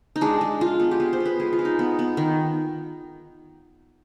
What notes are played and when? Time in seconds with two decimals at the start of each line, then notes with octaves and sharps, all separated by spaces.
0.16 D#4
0.21 G#3 D4
0.41 G#3
0.61 G#3 F4
0.80 B3
0.91 G4
1.00 B3 G#4
1.13 C5
1.20 B3
1.25 B4
1.40 G#3 G#4
1.53 F4
1.59 G#3
1.65 D#4
1.79 B3
1.99 B3
2.17 D#3